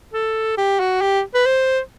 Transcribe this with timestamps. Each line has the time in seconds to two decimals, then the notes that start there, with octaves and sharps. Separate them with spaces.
0.14 A4
0.58 G4
0.80 F#4
1.02 G4
1.35 B4
1.46 C5